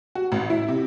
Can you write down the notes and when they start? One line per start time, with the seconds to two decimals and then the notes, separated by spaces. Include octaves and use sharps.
0.15 F#4
0.32 A1
0.50 E4
0.68 C3